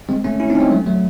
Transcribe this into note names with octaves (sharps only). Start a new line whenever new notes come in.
G#3 C4
A3 C#4
C#4 E4
C4 D#4
C#4
G#3 C4
F#3 A3
F#3 A3